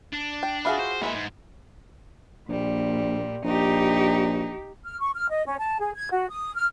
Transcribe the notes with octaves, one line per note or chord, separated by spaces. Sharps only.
D4
G5
F4 F#4 G#4 B4 E5 F5
C5
E3 G#3 A#3 E4 E5
G#2
A#1 A#2 G3
A#1 D#4 G4
F6
C#6
F6
D#5
C#4
A5
G#4
G#6
F#4
D#6
F6